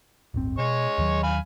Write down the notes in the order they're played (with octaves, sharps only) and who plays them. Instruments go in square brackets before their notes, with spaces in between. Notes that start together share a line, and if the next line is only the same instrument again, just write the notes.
[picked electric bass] D1 G1 C4
[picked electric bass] B2 [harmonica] G#3 C#5 C#6
[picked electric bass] D#2 D#3 F#3
[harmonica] F5 G#5 B5